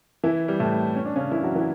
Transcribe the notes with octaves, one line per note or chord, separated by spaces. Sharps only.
E3 E4
G3
A2 A3
C#4
D4
C#3 C#4
E3 E4
F#3 F#4
E3 E4